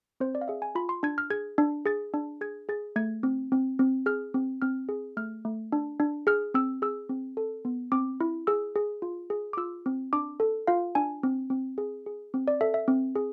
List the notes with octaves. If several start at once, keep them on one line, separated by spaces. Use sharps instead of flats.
C4 C5
D5
F5
G#4 E5
G#5
F4 B5
C6
D4 G#6
F6
G#4 G#6
D4
G#4 A6
D4
G#4 G#6
G#4 A6
A3 G#6
C4
C4
C4
G#4 F6
C4
C4 F6
G#4
A3 F6
A3
D4
D4
G#4 F6
C4 E6
G#4 E6
C4
A4
B3
C4 D6
E4
G#4 E6
G#4
F4
G#4
D6
F4 E6
C4
D4 D6
A4
F4 F5
D4 G#5
C4
C4
G#4
G#4
C4
D5
A4 E5
E5
C4
G#4